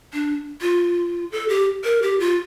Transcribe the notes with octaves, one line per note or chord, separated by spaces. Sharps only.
D4
F4
A4
G4
A#4
G4
F4